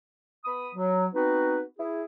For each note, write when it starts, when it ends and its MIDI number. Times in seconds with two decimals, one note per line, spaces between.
0.45 0.68 59
0.45 0.68 83
0.45 0.68 87
0.75 1.06 54
1.13 1.61 59
1.13 1.61 60
1.13 1.61 63
1.13 1.61 66
1.13 1.61 71
1.79 2.03 64
1.79 2.03 68